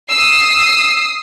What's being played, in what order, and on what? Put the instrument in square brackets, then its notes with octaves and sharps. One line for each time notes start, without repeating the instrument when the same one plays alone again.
[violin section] D#6 E6 C7